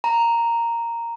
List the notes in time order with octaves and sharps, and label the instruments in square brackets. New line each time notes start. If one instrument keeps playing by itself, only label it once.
[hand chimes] A#5